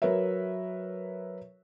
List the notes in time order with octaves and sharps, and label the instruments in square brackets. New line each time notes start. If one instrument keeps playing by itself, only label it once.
[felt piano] F#3 A#4 B4 C#5 E5